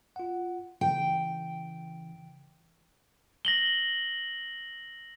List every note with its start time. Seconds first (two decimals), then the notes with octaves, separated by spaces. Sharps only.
0.16 F4 F#5
0.81 C#3 E3 G5
3.45 A#6 F#7 G7